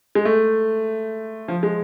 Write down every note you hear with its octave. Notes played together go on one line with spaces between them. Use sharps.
G#3
A3
F3
G#3